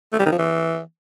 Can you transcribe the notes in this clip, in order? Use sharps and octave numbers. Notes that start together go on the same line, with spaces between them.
A3
G3
D#3
F3
E3